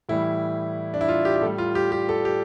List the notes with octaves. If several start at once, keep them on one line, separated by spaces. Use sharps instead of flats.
A2 E3 G3 E4
D4
E4
F4
G4
G4
A2 G3 A4
F4
G4
G4
A4
G4